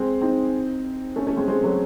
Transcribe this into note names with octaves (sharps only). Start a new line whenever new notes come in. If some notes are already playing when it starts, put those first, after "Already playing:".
Already playing: G#3 C4
C4 D#4
A3 C#4
A3 C#4
G#3 C4
G#3 C4
F#3 A3